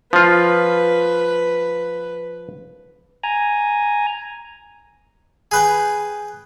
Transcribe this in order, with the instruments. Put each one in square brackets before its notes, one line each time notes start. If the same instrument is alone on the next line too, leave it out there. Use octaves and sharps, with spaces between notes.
[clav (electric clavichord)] F3 F4 [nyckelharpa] B4
[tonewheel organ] G#5 A#5
[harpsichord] G#4 B4 G5